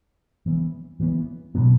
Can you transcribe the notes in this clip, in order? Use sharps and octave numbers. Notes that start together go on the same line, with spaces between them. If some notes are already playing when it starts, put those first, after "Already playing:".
E3 B3
E3 B3
B2 F#3 B3